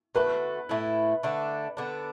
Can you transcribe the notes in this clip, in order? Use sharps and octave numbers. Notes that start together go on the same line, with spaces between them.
D3 A3 F#4 B4
A2 A3 E4
D3 A3 D4
D3 B3 D4